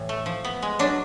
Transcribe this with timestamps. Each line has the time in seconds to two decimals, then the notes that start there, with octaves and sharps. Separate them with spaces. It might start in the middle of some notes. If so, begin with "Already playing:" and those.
Already playing: A2 E3
0.09 A3
0.26 F3
0.45 B3
0.62 G#3
0.79 F#3 D4